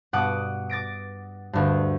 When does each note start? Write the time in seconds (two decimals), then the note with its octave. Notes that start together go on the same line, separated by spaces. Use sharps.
0.13 G2 B2 F#5 D6 D#6
0.70 D6 A6 A#6 D7
1.53 D2 G2